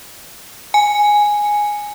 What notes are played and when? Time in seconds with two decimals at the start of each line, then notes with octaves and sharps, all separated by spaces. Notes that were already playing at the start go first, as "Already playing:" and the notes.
0.74 G#5